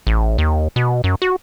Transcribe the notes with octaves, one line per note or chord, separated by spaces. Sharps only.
A1
D#2
B2
F#2
F#4